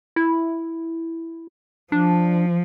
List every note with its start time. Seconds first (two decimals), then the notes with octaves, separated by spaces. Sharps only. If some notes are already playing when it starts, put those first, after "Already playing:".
0.16 E4
1.92 F3 D4